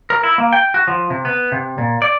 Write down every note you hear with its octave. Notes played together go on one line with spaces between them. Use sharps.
A#4
E4
A#3
G5
F#4
F3
C3
B3
C3
A#2
D5